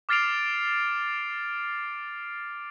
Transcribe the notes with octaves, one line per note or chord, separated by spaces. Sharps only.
D6 F6 A6 C7 D7 F7